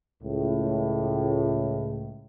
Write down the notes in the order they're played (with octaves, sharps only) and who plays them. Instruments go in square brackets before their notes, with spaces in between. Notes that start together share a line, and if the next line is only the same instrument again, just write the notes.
[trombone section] C#2 A2